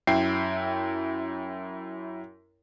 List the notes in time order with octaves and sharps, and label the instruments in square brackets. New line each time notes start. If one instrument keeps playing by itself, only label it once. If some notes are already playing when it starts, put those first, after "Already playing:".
[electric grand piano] F#2 E4 G5 C7